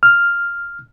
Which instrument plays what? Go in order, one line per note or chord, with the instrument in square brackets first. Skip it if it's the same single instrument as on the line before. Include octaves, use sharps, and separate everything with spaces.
[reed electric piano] F6